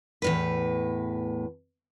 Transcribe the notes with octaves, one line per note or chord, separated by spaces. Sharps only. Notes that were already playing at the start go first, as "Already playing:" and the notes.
E2 A2 B4